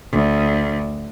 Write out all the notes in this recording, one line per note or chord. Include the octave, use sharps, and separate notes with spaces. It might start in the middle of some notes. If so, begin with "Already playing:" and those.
D2